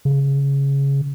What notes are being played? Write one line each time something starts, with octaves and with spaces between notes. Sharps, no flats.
C#3